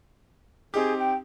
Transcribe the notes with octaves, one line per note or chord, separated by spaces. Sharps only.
C4 D#4 G4 G#4
G5